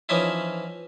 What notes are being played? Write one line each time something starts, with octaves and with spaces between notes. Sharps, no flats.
E3 F3 C#4 D#4 E4